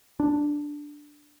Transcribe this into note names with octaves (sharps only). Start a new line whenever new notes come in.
D4